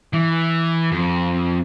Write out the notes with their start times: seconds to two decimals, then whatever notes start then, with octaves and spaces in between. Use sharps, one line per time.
0.13 E3
0.92 F2